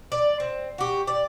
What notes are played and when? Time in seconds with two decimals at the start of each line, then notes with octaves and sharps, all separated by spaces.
0.12 D5
0.40 C4
0.78 F#4 G4
1.07 D5